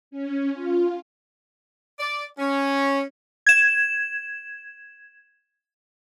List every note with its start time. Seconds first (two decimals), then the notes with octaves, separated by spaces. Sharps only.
0.11 C#4
0.54 F4
1.99 D5
2.38 C#4
3.47 G#6 E7